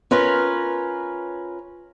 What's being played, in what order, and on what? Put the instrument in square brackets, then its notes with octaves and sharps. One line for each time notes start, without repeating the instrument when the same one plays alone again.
[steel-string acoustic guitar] C#4 F4 A#4 B4 C#5